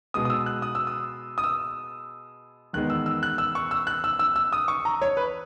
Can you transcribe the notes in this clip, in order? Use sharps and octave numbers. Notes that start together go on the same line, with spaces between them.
B2 G#3 B3 D#6
D#6
E6
F#6
D#6
E6
D#6
D#6
E6
E2 D#3 G#3 B3 F#6
E6
E6
F#6
E6
C#6
E6
F#6
E6
E6
E6
D#6
C#6
A#5
C#5
B4